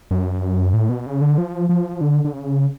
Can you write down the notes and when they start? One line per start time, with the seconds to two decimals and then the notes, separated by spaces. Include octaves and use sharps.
0.11 F#2
0.73 A2
0.89 B2
1.06 C#3
1.21 D3
1.38 F3
1.69 F3
2.01 D3
2.25 D3
2.33 C#3